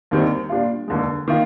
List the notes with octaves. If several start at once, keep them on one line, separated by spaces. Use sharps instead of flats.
D#2 D#3 G3 C4
A#2 G3 D4 F4
F1 D#2 D3 G#3
D#3 A#3 F4